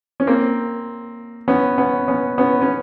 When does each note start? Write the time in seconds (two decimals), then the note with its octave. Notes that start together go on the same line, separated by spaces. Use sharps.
0.20 C#4
0.27 A#3 C4
1.48 B3 C#4
1.78 B3 C#4
2.08 B3 C#4
2.38 B3 C#4
2.62 C#4